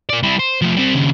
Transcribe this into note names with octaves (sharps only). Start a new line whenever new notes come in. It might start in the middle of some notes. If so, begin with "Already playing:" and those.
A#3 D5
G3 E4
C5
F3 A3
G3 C4
D#2 C#3